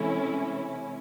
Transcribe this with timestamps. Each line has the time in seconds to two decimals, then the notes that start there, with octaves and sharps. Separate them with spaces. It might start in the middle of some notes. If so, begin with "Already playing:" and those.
Already playing: C3 E3 G#3 C#4 E4 A4